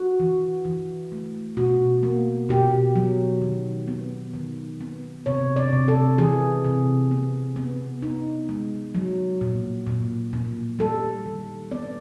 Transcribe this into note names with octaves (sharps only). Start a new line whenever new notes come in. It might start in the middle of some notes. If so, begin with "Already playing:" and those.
Already playing: F#4
E3
E3
A3
B2 F#4
A#3
B2 G4
F#3
D#3
B3
D#3
B3
C3 C#5
D5
C3
A4
E3 G#4
C3
B3
B3
B3 D#4
G#3
F#3
A#2
A#2
A#2
G3 A4
D#3
B3 D5